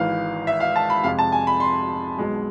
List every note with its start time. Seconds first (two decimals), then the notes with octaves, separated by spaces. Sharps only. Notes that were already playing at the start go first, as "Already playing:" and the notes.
Already playing: G#1 G#2 E3 F5
0.47 E5
0.60 F5
0.76 A5
0.90 B5
1.04 F2 C3 G#3 F5
1.19 A5
1.32 G#5
1.47 B5
1.60 C6
2.18 B1 B2 G#3